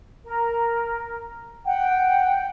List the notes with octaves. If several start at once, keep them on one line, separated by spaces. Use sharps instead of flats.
A#4
F#5 G5